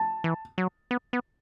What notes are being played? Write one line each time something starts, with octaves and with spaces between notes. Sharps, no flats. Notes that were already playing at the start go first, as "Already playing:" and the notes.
Already playing: A5
E3
F#3
B3
B3